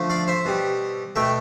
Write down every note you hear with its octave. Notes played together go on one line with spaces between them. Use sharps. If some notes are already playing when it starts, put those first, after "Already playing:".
Already playing: D3 F3 A3
D5 F5
C5 E5
B2 G3
B2 A3 E5 G5